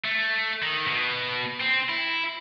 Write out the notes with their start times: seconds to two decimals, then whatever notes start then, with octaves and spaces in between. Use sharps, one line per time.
0.05 A3
0.62 D#3
0.87 B2
1.60 C4
1.89 E4